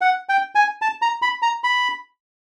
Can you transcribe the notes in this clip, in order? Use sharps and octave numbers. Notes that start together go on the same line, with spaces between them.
F#5
G5
G#5
A5
A#5
B5
A#5
B5